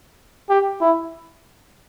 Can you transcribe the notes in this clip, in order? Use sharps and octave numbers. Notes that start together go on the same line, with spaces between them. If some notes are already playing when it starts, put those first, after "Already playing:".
G4
E4